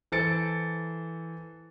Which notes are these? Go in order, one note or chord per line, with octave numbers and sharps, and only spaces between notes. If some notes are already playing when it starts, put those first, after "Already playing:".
E3 A4 C5 A6 C#7 D7